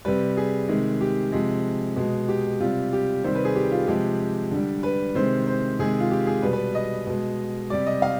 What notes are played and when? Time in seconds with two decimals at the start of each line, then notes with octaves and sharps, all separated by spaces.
0.05 C3 G3 B4
0.37 G#4
0.68 C3 D#3 G#3
1.01 G4
1.32 C3 F3 G#3
1.96 B2 G#3
2.28 G4
2.60 C3 G3 F4
2.93 G4
3.24 C3 D#3 G3 C5
3.35 B4
3.45 G#4
3.55 G4
3.72 F4
3.88 C3 F3 G#3 G4
4.51 D3 G3
4.83 B4
5.15 C3 D#3 G#3 C5
5.47 C5
5.79 C3 D#3 G#3 G#4
6.00 F4
6.11 G4
6.27 G#4
6.42 B2 G3 B4
6.53 B4
6.75 D#5
7.07 B2 G#3
7.70 C3 G3 D5
7.87 D#5
8.02 F5